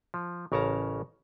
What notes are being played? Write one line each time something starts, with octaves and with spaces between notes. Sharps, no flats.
F3
A1 C#3 A#4 C#5 A5 A#5